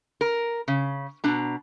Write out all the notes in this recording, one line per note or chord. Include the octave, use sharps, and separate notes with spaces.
A#4
C#3
B2 D4 A#5